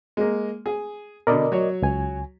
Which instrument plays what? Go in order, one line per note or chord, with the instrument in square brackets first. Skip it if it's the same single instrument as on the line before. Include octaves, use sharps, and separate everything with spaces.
[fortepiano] G#3 A#3
G#4
[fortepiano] B2 D3 [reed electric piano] A#4 D5 D#5
[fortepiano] F#3 C#5
[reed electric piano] C#2 G#5